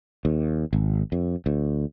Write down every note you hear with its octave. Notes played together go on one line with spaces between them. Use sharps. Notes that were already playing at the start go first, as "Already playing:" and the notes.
D#2
G#1
F2
D2